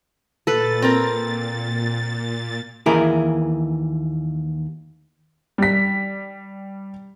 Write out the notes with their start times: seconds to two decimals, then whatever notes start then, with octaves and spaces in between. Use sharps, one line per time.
0.47 A#2 A4 B4 A6
0.82 C4 A#4
2.86 D#2 E3 E4 G#4 A#4
5.58 G3 B6